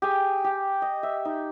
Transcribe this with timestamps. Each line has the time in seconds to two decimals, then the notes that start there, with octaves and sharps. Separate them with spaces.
0.02 G4 G#4 G#5
0.44 G4
0.82 D#5
1.03 E5
1.25 D#4